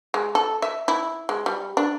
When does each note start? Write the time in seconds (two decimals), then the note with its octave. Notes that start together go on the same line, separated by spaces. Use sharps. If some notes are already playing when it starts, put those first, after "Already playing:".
0.14 G#3
0.35 A4
0.62 E5
0.88 E4
1.29 G#3
1.46 G3
1.77 D4